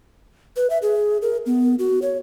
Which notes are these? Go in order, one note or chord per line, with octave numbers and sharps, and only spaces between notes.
B4
E5
G#4
A#4
B3
F#4
C#5